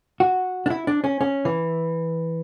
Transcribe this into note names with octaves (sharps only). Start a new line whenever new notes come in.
F#4
D4
E4
D4
C#4
C#4
E3